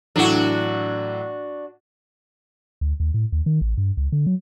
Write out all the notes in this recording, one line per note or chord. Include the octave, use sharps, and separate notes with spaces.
A2 E3 F#3 D4 F#4
D2
D#2
A2
D#2
D#3
A1
G2
C#2
D3
F#3